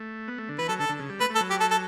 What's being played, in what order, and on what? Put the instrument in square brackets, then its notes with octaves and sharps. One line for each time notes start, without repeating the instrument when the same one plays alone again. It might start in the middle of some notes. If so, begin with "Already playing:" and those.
Already playing: [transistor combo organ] A3
B3
A3
D3
[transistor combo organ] E3 [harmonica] B4
[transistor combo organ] F#3 [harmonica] A4
[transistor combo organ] D3 [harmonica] A4
[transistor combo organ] D3
C#3
G3
[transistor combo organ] A3 [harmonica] B4
[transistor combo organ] A3
[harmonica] A4
[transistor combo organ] F#3
[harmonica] G4
A4
A4